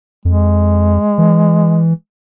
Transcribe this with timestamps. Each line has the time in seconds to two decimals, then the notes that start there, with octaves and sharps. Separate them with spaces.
0.25 F2 G#3
1.18 E3